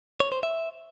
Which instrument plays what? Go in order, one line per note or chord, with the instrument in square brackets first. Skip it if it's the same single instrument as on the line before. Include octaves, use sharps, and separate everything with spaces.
[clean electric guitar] C#5
C5
E5